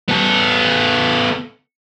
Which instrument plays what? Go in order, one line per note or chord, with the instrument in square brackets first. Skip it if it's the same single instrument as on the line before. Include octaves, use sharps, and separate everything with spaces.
[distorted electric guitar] B3 A4